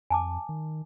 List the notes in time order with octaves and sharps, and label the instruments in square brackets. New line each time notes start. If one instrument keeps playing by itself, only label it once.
[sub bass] F2 [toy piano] G#5 A5 D6
[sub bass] D#3